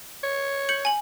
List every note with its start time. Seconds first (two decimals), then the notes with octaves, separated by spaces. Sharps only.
0.23 C#5
0.69 G6 C#7 F#7
0.85 G#5 F#7